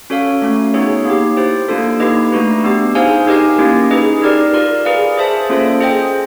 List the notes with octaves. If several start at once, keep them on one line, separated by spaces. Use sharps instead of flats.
C#4 F#4 A4 C#5 F5
A3 C#4 F#4
B3 D#4 G#4 C#5
A#3 D#4 G4
E4 G4 C5
A#3 D4 F4 A4
A#3 D#4 G4 B4 D#5
A3 D4 F#4 B4
B3 D4 G4
D#4 G#4 C5 F5 G#5
D#4 G4 A#4 D#5 G#5
A#3 C#4 E4 G4
D#4 G#4 B4 D#5
D#4 G4 A#4 D5
F4 A#4 D5
G#4 B4 D5 F5
G#4 C5 E5 A5
A#3 C#4 F4 A4 C5
G#4 C5 D#5 G5